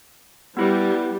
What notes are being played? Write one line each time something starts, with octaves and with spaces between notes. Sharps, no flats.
G3 B3 E4 B4